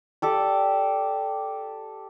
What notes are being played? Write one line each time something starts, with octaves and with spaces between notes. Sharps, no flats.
G4 A4 D5